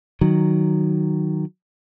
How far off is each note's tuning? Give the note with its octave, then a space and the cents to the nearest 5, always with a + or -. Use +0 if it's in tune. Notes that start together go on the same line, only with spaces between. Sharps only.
D#3 -10 F#3 +0